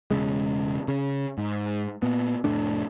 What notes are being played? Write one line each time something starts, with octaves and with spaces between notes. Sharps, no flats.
E1 C2 C#3 G#3
C#3
G#2
A#2 B3
F1 A2 A3 D4